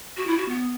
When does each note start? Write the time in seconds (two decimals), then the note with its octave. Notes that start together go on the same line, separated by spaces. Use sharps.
0.17 F#4
0.27 E4
0.38 F#4
0.49 B3